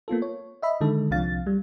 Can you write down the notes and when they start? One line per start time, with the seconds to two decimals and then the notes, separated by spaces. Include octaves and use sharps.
0.08 A#3 B3 F4 A4
0.22 C#5
0.62 D#5 E5 B5
0.81 D3 D#3 G#3 A4
1.11 C2 C3 F3 D4 F5 A6
1.47 G3